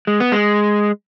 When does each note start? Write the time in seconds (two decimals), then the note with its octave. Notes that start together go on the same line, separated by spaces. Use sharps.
0.07 G#3
0.20 B3
0.32 G#3